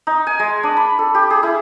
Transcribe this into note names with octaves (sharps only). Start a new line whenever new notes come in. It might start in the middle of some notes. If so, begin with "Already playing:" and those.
D#4
G#5
G#3
D4
B5
A4
G4
G#4
E4